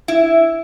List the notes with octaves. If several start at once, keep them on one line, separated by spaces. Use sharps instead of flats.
E4